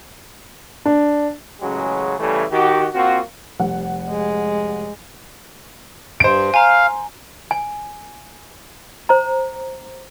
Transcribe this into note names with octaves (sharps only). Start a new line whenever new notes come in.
D4
A1 C#3 F#3 G#3 C#4 F#4
C#3 E3 G3 A3
D#3 F#4 G4
A#3 C4 F4 F#4
F1 G3 F#5
G#3
G2 C5 D7
F5 G#5 A#5
G#5
C5 A#5